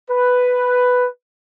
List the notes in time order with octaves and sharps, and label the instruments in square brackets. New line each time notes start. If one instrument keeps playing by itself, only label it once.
[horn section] B4